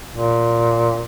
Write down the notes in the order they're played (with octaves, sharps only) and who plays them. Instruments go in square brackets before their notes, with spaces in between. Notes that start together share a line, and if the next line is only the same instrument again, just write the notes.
[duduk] A#2